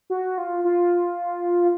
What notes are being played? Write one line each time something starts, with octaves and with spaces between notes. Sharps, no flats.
F#4
F4
F4